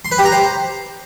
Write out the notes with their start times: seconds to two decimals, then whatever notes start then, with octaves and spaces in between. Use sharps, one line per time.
0.05 C6
0.12 B4
0.18 G4
0.25 A#5
0.32 C5